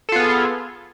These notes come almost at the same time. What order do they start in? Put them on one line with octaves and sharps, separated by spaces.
A4 F4 B3 G#4